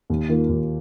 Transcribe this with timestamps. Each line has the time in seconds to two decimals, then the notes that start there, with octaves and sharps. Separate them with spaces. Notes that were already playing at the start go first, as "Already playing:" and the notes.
0.10 D#2
0.29 D#3 A#3 F4
0.49 D#2